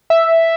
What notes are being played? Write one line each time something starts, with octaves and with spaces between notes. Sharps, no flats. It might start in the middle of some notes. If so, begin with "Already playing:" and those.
E5